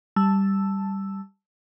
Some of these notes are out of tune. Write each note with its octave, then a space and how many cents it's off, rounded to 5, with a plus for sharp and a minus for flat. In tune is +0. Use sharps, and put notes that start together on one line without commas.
G3 +0 A5 +0 E6 +0